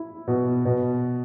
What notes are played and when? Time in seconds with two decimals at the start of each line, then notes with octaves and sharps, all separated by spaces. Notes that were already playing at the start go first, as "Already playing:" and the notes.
Already playing: E4
0.28 B2
0.65 B2